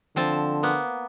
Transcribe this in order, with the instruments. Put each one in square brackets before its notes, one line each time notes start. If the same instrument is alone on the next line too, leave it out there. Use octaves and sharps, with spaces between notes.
[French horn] D3 [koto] F3 C4 A5
[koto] A#3 B3